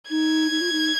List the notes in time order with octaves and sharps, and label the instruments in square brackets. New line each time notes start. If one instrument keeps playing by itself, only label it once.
[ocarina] D#4 [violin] G#6
[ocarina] D#4
F4
D#4